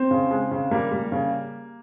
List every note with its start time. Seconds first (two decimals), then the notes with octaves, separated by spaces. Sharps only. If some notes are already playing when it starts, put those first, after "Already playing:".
Already playing: C4
0.11 C#3
0.31 G#3
0.51 C#3
0.71 G3 A#3
0.92 G3
1.12 C#3